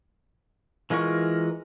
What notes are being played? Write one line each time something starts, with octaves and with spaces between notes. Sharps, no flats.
E3 G#3 F4 A#4 C#6